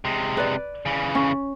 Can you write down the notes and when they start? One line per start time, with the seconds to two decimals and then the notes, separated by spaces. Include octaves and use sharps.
0.05 C3 G#3
0.37 B4 D5
0.86 C#3 E3
1.15 C#4